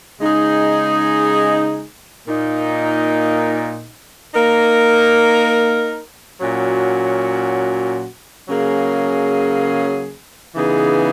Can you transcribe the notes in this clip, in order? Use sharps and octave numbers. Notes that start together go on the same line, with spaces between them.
C#3 G#3 D#4 G#4
A#2 A#3 D#4
A#3 D#4 A#4
A#2 F#3 C#4 F#4
C#3 F#3 A#3 C#4 G#4
C#3 E3 B3 D#4 G#4